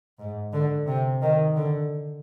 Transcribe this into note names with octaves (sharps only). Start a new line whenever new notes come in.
G#2
D3
C3
D#3
D3